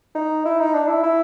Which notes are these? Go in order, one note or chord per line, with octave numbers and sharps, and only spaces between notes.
D#4
E4
D#4
D4
E4
E4